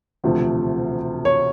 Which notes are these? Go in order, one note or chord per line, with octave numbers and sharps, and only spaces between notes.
E1 D2 C3 F3 A3
C#5